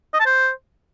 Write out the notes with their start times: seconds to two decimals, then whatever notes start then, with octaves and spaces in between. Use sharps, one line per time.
0.14 D#5
0.20 A5
0.26 C5